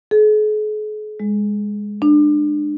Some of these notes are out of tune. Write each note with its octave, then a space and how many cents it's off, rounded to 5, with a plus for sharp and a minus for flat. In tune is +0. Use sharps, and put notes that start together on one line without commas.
G#4 +45
G#3 -10
D4 +25